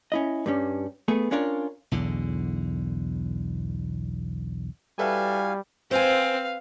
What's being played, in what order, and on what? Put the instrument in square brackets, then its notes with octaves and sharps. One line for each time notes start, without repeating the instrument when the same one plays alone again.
[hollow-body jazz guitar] C#4 E4 D#5
G2 G3 C#4
A3 B3 G#4
C#4 D4 F4 A#4 C#5
[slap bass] B1 E2 D3
[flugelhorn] G3 [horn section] E4 F#4 G#5 [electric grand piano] A4 B4 E5 [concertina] F5
[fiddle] C4 [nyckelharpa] B4 F5 [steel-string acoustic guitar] C5 G#5